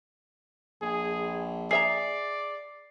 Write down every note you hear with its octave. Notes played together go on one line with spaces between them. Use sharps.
A#1 G#4
G#4 D5 E5 A#5 C7